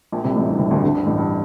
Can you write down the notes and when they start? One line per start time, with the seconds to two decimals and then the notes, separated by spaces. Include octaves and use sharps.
0.12 A#1 A#2
0.24 C2 C3
0.35 A1 A2
0.47 G2
0.59 C2 C3
0.71 D2 D3
0.83 D2 D3
0.95 G2
1.06 A1 A2
1.18 G2